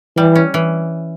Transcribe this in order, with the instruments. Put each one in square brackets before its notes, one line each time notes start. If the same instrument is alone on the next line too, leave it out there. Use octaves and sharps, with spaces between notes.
[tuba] E3 [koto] G3
[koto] C#4
E3